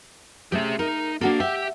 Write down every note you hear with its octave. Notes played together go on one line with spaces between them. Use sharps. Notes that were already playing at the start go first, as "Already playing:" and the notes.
A3 C#4 G4 G#4 E5
D#4 A#4
A#3 D4 F#4 A4
G4 E5 G5